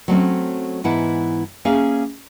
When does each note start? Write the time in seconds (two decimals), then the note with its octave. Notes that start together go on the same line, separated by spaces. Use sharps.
0.08 F#3 A3 C4 C#4
0.84 G#2 E3 B3 E4 F#5 A5
1.65 A#3 C#4 G#4 E5 F5